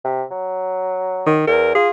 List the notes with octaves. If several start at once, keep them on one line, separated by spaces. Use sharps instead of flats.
C3
F#3
D#3
E2 A#4
F4 G#4